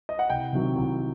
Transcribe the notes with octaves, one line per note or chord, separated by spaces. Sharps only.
D#5
F#5
C2 G5
C3 D#3 F#3
C2